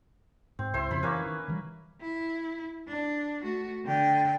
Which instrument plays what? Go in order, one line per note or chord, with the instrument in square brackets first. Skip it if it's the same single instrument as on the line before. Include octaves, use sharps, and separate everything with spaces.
[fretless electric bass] G#2 [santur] C4
[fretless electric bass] C#2 [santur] E4 C5 C6
[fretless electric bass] F2 C#3 [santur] C5 B5
[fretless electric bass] E3 [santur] A#3 C#4 B4
[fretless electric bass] D#3
D#3 E3 G3
[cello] E4
D4
A3 F#4
D3 G5